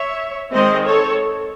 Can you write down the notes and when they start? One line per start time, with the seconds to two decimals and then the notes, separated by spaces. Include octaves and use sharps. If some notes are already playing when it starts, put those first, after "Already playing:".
Already playing: C#5 E5
0.53 D#3 G#3 C4 C5 D#5
0.85 A4 C#5